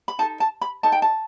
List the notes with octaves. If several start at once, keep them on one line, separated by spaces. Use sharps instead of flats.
B5
D#4 A4 A5
A5
B5
D#4 A4 A5
G5
A5